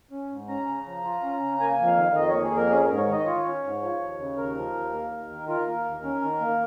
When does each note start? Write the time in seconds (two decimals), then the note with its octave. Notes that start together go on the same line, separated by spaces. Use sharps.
0.11 C#4
0.30 G#2
0.48 C#4 A#5
0.67 C#3
0.86 F3
1.04 F4
1.23 C#4
1.41 C#3
1.59 A#3 G#5
1.79 F2
1.87 F5
1.96 D#3
2.14 F2 D#5
2.29 A#3 C#5
2.43 G#4
2.52 F2
2.57 A#4
2.71 C#4 G#4
2.85 G#2 A#4
2.98 C#5
3.08 D#3 D#5
3.26 F4 C#5
3.45 C#4
3.64 G#2
3.81 F3
4.00 D#2
4.19 C#3
4.37 D#2 A#4
4.55 F3
4.74 D#2
4.93 A#3
5.12 D#2
5.30 D#3
5.48 F4 A#4
5.67 A#3
5.85 D#2
6.04 C#4
6.22 D#3
6.41 A#3